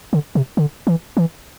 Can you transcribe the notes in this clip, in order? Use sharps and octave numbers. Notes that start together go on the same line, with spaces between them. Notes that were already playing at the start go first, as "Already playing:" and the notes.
D3
C3
D3
E3
E3